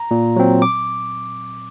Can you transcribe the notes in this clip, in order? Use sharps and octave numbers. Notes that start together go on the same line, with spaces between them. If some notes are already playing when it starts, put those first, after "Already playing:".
Already playing: A#5
A#2
F#3 C4
D6